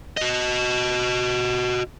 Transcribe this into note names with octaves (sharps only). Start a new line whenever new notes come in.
F#4 D#5